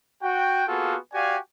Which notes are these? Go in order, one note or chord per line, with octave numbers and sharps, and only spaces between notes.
F#4 G5
A#3 B3 F4 F#4 G#4 A4
F#4 G4 D5 F5 G#5